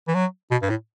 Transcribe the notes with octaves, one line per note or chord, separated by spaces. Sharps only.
E3
F#3
B2
G2
A2